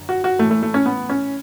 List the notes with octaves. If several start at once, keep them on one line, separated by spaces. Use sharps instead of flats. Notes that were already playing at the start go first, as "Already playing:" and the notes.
Already playing: F#2 D3
F#4
F#4
A2 E3 A3
A3
A3
C#4
B3
C#4